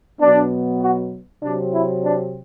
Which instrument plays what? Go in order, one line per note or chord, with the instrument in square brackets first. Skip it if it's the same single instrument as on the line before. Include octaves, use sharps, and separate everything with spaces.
[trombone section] B2 F#3 B3 D4
F#4
C3 F#3 C4 D4
E4
D4